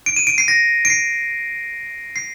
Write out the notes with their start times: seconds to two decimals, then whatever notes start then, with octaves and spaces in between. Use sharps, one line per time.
0.06 D7
0.16 D#7
0.27 D7
0.38 C7
0.48 A#6
0.85 D7
0.90 C7
2.16 C7